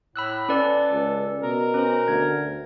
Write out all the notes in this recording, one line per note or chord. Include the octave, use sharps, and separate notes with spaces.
A2 B5 E6 F#6
C#4 A4 B4 D5
C#2
B2 A#4
C#4 C5
D2 G#6